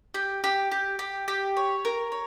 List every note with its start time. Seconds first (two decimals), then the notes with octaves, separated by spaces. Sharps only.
0.14 G4
0.44 G4
0.71 G4
0.99 G4
1.28 G4
1.57 C#5
1.85 A#4
2.12 C#5